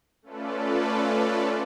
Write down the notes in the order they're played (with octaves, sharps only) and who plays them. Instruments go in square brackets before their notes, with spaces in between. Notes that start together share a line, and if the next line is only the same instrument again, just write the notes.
[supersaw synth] A3 C#4 F4 A4 B4 D5